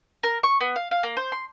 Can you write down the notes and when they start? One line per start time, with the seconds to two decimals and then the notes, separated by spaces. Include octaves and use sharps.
0.23 A#4
0.43 C#6
0.61 B3
0.76 F5
0.91 F5
1.03 A#3
1.17 C5
1.32 C6